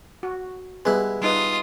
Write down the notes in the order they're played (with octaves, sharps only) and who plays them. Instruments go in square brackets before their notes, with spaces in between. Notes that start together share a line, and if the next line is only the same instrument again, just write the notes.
[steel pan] F#4
[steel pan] G3 B3 B4 [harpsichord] G#3 E4
[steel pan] G3 D#4 B4 [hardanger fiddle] F4 D#6